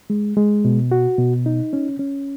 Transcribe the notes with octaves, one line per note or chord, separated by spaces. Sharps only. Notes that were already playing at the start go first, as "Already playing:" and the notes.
G#3
G#3
B2
F#4
B2
D#4
C#4
C#4